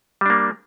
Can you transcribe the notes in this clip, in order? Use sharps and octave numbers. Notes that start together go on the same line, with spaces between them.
G3 A#3 D4